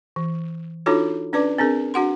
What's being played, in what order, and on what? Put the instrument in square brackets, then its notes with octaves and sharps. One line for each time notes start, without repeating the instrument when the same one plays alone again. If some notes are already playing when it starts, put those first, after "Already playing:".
[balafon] E3
D4 D#4 F4 F#4 A4 C#5
C#4 D4 B4 D5 D6
C4 D4 G#4 A#4
D4 F#4 F#5 C6